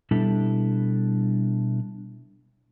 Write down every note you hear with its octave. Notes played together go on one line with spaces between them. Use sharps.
B2 G3 D4 E4 A4